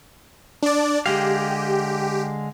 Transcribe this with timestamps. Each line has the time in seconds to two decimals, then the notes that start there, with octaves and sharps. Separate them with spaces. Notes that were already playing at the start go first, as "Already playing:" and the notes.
0.63 D4 D5
1.06 D3 G#3 G4 F5